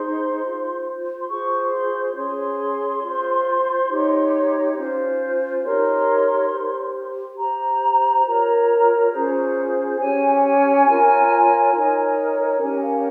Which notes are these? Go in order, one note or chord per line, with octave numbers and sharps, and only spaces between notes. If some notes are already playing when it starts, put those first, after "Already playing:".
Already playing: D#4 G#4 C5 C6
F4 C5
C6
F4 G#4 C5 C#6
C6
C#4 G#4 C#5 C6
F4 C5
D#4 G4 C#5
C#4 F4 C5
D#4 G4 A#4 C#5 C6
G4 C5
G4 C5 A#5
F4 A#4 C#5
C#4 F4 G#4 C5
C#4 G4 C#5 G#5
G#5
F4 A#4 C#5
D#4 A#4 C#5
C#4 G4 A#4 C#5 G#5
F5